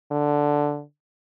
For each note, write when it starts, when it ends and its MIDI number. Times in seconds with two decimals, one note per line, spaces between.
0.11 0.82 50